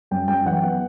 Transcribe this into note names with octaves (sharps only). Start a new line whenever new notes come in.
F#2 G5
F#2 G5
E3 F#5
B3